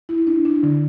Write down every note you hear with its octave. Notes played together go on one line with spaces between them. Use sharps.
E4
D4
D4
D3